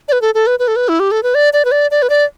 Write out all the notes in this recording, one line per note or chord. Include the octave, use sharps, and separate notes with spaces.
D5
B4
A4
A4
B4
B4
A4
B4
E4
G4
A4
B4
D5
D5
B4
D5
D5
B4
D5